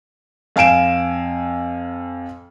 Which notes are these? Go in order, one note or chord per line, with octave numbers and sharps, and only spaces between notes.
F2 F5 G#5 D7 E7